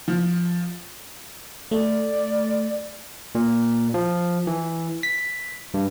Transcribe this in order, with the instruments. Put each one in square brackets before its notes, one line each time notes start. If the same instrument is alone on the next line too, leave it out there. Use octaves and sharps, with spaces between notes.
[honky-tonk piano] F3
[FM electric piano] A3 [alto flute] D5
[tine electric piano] A#2
F3
E3
B6
G2